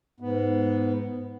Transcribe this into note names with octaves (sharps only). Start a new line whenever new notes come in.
G#2 B3